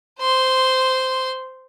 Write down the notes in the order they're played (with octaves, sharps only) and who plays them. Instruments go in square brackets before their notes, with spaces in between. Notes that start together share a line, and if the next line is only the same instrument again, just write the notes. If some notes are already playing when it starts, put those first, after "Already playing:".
[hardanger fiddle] C5 C6